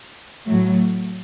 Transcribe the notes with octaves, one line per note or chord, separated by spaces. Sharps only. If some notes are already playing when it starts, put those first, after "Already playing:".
A2 F#3 A3